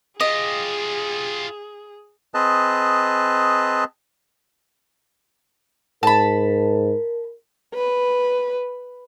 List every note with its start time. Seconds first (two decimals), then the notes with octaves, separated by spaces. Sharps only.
0.21 F4 G4 G#4 D#5
2.34 C4 G#4 B4 D#5 A5
6.03 G#2 A#4 A5 B5
7.74 B4